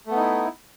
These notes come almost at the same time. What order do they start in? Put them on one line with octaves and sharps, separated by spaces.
A3 B3 D#4 E4